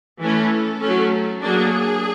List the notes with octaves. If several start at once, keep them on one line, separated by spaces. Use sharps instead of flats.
E3 A3 C#4 A4
F#3 A3 C#4
F#3 A#3 D4 G#4